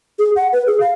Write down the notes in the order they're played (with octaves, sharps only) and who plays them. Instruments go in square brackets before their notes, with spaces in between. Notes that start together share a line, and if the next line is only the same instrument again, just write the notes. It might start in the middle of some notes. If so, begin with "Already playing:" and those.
[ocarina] G#4
F#5
B4
G#4
F5